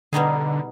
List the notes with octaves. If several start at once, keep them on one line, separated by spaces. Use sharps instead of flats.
B2 D3 G3 B3 D#4 G#4